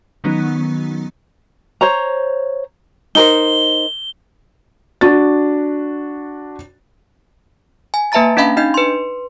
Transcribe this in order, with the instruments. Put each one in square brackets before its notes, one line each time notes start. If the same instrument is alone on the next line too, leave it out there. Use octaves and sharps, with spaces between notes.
[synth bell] D#3 F#3 B3 C#4 D#4
[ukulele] C5 C#5 A#5
[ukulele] D#4 A#4 C5 [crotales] G7
[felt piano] D4 F#4 A6
[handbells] G#5
A#3 B4 E5 A5 A#5 A6
C#4 D4 D#5 F5 B5
D4 D#4 D#5 G6
B4 C6